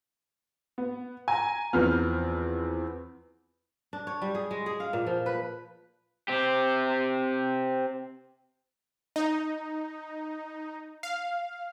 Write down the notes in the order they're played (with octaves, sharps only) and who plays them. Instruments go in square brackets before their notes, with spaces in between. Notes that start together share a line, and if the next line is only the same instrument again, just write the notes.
[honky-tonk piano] B3
[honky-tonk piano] G#5 [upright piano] A#5
[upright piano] E2 F3 F6 [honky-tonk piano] B3 C4
[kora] D4
C#5
G3
G#4
G#3
G#4
F5
A#2
F3
B4
[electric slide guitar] C4 G4
[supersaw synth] D#4
F5